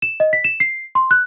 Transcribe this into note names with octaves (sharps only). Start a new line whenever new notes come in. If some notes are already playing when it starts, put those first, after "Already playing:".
E7
D#5
B6
E7
C7
C6
F#6